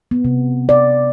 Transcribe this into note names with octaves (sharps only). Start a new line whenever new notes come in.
B3
C3
D5